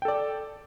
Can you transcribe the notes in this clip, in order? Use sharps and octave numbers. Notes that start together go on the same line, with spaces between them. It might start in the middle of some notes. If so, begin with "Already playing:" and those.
A4 D5 G5